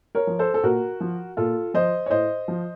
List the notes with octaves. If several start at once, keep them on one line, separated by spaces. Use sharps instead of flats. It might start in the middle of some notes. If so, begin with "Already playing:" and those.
A#4 C#5
F3
A4 C5
A4
A#2 F#4 A#4
F3
A#2 F4 A4
F3 C5 D#5
C#5
A2 C5 D#5
F3